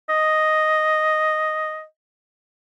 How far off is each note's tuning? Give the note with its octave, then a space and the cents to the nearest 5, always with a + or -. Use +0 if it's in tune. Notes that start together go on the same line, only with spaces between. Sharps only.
D#5 +0